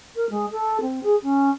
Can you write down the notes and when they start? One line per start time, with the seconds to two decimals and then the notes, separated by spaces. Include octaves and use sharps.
0.16 A#4
0.30 G#3
0.51 A4
0.81 C4
1.03 G#4
1.23 C#4